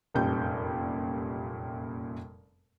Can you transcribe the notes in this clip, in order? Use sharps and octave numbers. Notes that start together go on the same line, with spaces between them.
F1 F#2 A#2 G3 G6